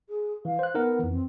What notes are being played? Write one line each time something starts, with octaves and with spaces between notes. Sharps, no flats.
G#4
E3 F5
C5 F#6
B3 D#4 A#4 F#5
F2 E3
C4